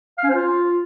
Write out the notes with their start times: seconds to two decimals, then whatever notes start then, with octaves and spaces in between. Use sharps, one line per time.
0.18 F5
0.23 C#4
0.29 C5
0.34 F4